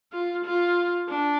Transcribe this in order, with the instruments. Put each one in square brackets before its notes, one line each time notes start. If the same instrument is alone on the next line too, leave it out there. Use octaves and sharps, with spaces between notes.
[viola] F4
F4
D4